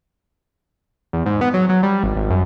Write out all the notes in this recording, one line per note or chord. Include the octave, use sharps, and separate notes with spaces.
E2
G#2
B3
F#3
F#3
G3
G#1
G#1
F#2